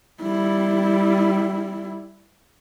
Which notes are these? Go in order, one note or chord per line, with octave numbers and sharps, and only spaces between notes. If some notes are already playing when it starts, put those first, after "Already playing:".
G3 E4